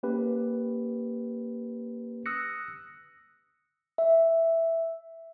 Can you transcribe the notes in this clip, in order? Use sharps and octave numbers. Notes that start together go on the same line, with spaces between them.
A#3 C#4 G4 B4
D#6 E6 F#6 A#6 C#7
E5